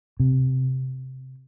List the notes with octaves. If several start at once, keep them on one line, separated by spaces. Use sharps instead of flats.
C3